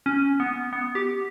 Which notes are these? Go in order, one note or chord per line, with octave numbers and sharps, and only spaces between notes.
C#4
B3
B3
G4